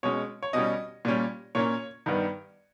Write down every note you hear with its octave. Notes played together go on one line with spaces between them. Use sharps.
B2 G#3 C#4 C#5
C#5
B2 G3 C#4 D#5
A#2 G3 C#4
A#2 A#3 C#4 C#5
G2 D#3 G3 B3